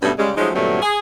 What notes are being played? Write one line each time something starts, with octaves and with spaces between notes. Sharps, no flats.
G2 B2 F#3 A3 B3 C#4
C#3 G3 G#3
F3 F#3 G#3 A3 C#4 D#4
G2 A#2 D3 F#3 A3 C4
G#4